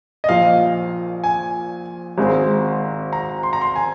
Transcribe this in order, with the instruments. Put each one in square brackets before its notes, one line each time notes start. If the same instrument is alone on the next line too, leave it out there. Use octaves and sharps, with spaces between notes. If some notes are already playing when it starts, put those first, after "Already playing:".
[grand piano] D#5
[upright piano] A#1 A#2 F3 [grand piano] F5
[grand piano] G#5
[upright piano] G#1 G#2 G#3 C4
[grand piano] A#5
C6
A#5
C6
G#5